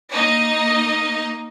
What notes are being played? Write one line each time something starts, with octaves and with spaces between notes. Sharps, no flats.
A#3 D#4 D#5